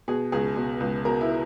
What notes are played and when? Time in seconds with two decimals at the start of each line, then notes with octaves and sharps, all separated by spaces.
0.08 B2 G#4
0.32 C#2 G#4
0.56 B2
0.80 C#2
1.05 B2 A#4
1.21 E4